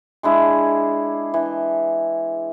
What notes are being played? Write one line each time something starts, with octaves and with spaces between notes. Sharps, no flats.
G#3 D4 E4 G#4
E3